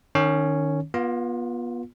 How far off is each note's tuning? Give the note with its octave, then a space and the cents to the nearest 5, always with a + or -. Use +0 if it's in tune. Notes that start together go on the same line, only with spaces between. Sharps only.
D#3 -25 C#4 +0 C#5 +0
B3 -30 F4 +15